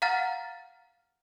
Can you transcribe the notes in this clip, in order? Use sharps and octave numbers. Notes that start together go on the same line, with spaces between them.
F5 F#5 A#5 F6 A6